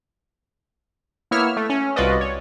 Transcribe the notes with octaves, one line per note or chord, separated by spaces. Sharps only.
A#3 B3 E4 C#5 E6 F6
A3
C#4
C2 F4 F#4 B4 D5 D#5
C#5